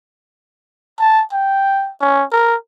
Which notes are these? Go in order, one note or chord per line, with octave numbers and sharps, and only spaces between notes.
A5
G5
C#4
A#4